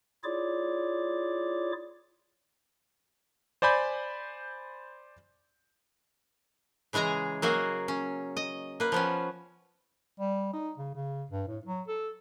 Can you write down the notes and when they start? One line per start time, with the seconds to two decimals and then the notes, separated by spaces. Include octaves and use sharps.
0.24 E4 F4 G#4 C#5 D5 D6
3.62 C5 D5 G#5 B5 G6
6.93 C#3 E3 G#3 G#4 A#5
7.42 F#3 A#3 F#4 G#4
7.88 C#4
8.37 D#5
8.80 A#3 B4
8.92 F3 B3 C#4
10.20 G3
10.53 D#4
10.78 C#3
10.95 C#3
11.31 G2
11.48 A2
11.66 F#3
11.88 A4